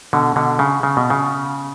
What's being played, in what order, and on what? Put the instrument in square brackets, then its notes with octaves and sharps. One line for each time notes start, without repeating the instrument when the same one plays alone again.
[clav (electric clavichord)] B2 D3
B2 D3
C#3
C#3
B2
C#3